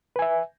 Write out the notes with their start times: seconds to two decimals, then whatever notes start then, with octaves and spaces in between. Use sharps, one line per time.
0.16 B4
0.19 G#5
0.22 E5